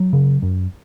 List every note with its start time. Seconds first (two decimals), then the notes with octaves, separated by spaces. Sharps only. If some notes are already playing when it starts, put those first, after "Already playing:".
Already playing: F#3
0.13 C#3
0.42 F#2